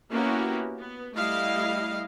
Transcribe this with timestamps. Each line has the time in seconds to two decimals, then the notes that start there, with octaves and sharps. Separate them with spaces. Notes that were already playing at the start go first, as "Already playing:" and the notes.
0.11 A#3 B3 C#4 E4 F#4 G4
0.78 B3
1.16 G3 A3 E4 D#5 F5